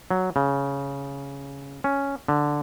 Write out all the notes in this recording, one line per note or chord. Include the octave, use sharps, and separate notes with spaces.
F#3
C#3
C#4
D3